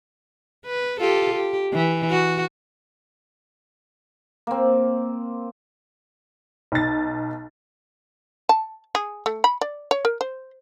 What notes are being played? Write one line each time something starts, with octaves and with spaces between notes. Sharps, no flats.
B4
F4 G4 A4
G4
E3
F#4
A#3 C4
B1 A6
A5
G#4
A3
B5
D5
C#5
A#4
C5